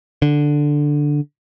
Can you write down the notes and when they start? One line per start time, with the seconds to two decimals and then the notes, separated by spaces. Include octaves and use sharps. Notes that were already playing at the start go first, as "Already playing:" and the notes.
0.22 D3